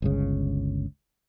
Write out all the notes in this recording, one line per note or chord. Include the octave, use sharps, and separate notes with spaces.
G1 C#2 C#3